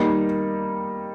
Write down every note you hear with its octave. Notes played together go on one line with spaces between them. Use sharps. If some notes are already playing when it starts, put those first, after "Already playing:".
Already playing: D#3 G3 A#3 D#4